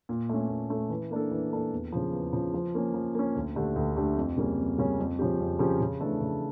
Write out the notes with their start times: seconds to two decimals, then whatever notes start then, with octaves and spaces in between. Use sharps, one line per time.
0.09 A#2
0.29 A3 C#4
0.49 A#2
0.70 A3 C#4
0.90 E3
1.11 A#3 D4 A4
1.31 E3
1.52 A#3 D4 A4
1.72 E2
1.92 C#3 F3
2.13 E2
2.33 C#3 F3
2.54 F3
2.75 A#3 C#4
2.94 F3
3.15 A#3 C#4
3.36 D2
3.56 D3 A3 D4 G4
3.76 D2
3.96 D3 A3 D4 G4
4.16 F2
4.37 C#3 G3 A#3 C#4
4.58 F2
4.78 C#3 G3 A#3 C#4
4.98 F2
5.19 C#3 F3 C#4 G4
5.40 F2
5.59 C#3 F3 C#4 G4
5.80 C#3
6.00 E3 A3 D4 A4
6.21 C#3